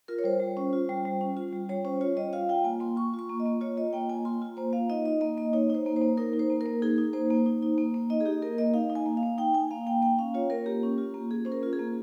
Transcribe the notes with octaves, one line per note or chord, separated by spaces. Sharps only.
F4 A#4
C#5
G3 C5
G3
C#4
F4
G3
G3
C#4
F4
G3
G3 C#5
C#4 C5
F4 C#5
G3 D#5
F4 F5
F4 G5
A#3 G#5
A#3 C6
F4 C#6
F4 C#6
A#3
D#5
A#3
F4 C#5
F4 D#5
A#3 G5
A#3 G#5
F4 C6
F4
A#3 C5
A#3 F5
D#4 D#5
D#4 D#5
A#3 D#5
A#3 D#5
D#4 C#5
D#4 C5
A#3
C5
A#3
D#4 A#4
D#4
C5
A#3
A#4
A#3
D#4 G#4
D#4
A#3 C5
A#3
D#4
D#4
A#3
A#3
D#4 D#5
G#4
D#4 G4
A#3 A#4
A#3 D#5
D#4 F5
D#4
G#5
A#3
F5
A#3
D#4 G5
D#4 G#5
A#3 F5
A#3 G5
A#3 G5
C#4 F5
F4 C#5
A#3 A#4
A#3 G4
C#4
F4
A#3
A#3 G#4
C#4 C5
A#4
F4
G#4
A#3